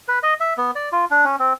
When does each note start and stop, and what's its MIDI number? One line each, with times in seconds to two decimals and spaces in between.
0.08 0.19 71
0.23 0.34 75
0.40 0.54 76
0.58 0.71 59
0.75 0.89 74
0.92 1.05 65
1.11 1.25 62
1.25 1.36 61
1.39 1.53 60